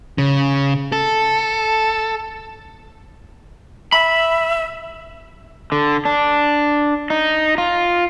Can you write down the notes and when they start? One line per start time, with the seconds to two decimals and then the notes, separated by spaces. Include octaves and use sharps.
0.18 C#3
0.92 A4
3.92 E5 B5
5.72 D3
6.05 D4
7.10 D#4
7.58 F4